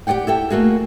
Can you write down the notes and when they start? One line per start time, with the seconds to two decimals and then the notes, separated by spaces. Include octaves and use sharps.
0.07 G4 G#4 D5 F#5 G5
0.27 E4 A4 G5
0.50 A3 A#3 F#4 G#4